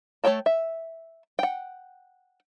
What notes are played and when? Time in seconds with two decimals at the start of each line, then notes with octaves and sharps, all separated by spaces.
0.24 A3 A#4 C#5 G5 A5
0.46 E5
1.39 F#5 G5